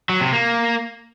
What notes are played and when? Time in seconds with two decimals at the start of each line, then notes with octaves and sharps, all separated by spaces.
0.09 F#3
0.21 C3
0.32 A#3